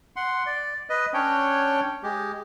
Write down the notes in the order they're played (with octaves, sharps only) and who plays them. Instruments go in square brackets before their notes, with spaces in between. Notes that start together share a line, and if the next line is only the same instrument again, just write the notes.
[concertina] F#5 C6
D5
B4 D#5
C#4 D4 C#5 G5
G#3 G4